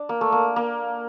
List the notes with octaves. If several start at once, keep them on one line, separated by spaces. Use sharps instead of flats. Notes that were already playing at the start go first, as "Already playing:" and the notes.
Already playing: D4
A#3
A3
A#3
A#3